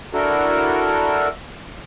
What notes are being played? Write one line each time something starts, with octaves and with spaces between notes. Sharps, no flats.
D4 E4 F#4 A4 A#4